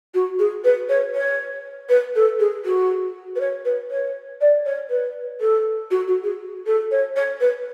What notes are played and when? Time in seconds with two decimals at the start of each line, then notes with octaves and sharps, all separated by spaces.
0.14 F#4
0.39 G#4
0.64 B4
0.89 C#5
1.14 C#5
1.89 B4
2.15 A4
2.39 G#4
2.65 F#4
3.35 B4
3.40 C#5
3.65 B4
3.90 C#5
4.41 D5
4.65 C#5
4.90 B4
5.40 A4
5.90 F#4
6.07 F#4
6.23 G#4
6.66 A4
6.91 C#5
7.16 C#5
7.40 B4